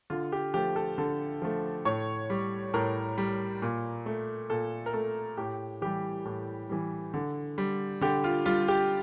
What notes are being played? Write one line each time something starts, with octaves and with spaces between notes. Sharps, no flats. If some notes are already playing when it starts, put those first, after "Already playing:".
D3 F4
G4
F3 A3 G4
A4
D3 A4
F3 A3
A2 C#5
G3
A2 A#4
G3
A#2
A3
A#2 A4
A#4
A3 A4
A2 G4
E3 G3 G4
A2
E3 G3
D3
G3
D3 G4
F4
G3 F4
G4